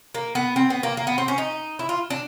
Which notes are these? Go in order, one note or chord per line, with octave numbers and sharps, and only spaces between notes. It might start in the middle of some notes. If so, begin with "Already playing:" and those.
A#3
B3
C4
B3
A#3
A#3
B3
C4
C#4
D#4
E4
F4
D4